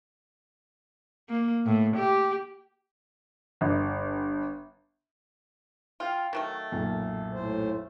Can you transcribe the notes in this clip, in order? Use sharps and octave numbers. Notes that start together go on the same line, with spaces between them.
A#3
A2
G4
G1
F4 F5 G5
D#3 F#3 A3
B1 F#2 A#2
A2 C5